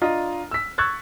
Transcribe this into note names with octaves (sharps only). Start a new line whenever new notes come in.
D4 F4 D#5 A#5
E6 B6
C#6 E6 F#6 G#6 A6